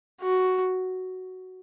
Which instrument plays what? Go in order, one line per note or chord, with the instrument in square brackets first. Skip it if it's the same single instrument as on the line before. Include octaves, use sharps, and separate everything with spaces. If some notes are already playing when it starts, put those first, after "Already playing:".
[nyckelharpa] F#4